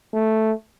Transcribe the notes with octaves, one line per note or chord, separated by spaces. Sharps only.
A3